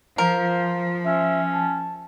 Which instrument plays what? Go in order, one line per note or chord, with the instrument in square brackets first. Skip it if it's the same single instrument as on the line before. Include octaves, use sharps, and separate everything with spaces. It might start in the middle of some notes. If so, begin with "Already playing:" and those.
[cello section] F3 [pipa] A#4 [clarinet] C5 [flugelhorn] F5
[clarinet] C#4 [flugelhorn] E5
[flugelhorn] A5